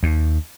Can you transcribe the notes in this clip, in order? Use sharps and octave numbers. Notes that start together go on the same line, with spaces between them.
D#2